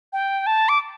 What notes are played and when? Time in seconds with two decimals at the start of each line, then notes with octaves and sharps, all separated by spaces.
0.13 G5
0.47 A5
0.69 D6